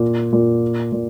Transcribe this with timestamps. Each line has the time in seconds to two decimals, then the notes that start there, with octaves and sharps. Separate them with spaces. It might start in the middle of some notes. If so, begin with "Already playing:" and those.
Already playing: A#2
0.33 A#2
0.92 A#2